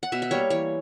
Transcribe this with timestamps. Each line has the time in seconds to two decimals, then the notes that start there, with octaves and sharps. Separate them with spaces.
0.03 F#5
0.12 B2 E5
0.22 E5
0.31 G3 A#3 C#5
0.50 E3 C#5